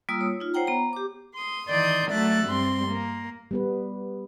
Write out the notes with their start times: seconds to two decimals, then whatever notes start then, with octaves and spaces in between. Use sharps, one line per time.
0.09 G3 A#3 F4 D#6 E6
0.21 C#5
0.40 D#4 F4
0.54 C5 C#5 F#5 G5 A#5
0.67 B3 A#5
0.93 G4 D6
1.35 C6 D#6
1.68 D#3 E3 D5 C6 D#6 G6
2.10 F#3 A3 D4 E5 F#6 A6
2.47 G2 G3 C4 C6
2.88 A#3
3.51 G3 B3 B4